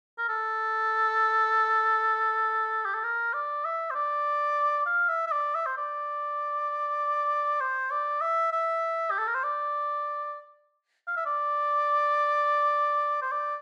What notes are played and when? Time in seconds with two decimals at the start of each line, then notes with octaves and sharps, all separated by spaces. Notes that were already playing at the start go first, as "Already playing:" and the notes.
0.18 A#4
0.29 A4
2.85 G4
2.94 A4
3.04 A#4
3.34 D5
3.65 E5
3.91 C5
3.95 D5
4.86 F5
5.08 E5
5.27 E5
5.32 D5
5.55 E5
5.66 C5
5.77 D5
7.61 C5
7.91 D5
8.21 E5
8.52 E5
9.11 G4
9.19 A4
9.27 A#4
9.35 C5
9.44 D5
11.08 F5
11.17 E5
11.26 D5
13.22 C5
13.32 D5